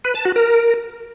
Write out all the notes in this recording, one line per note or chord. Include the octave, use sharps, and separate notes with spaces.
B4
A5
F#4
A#4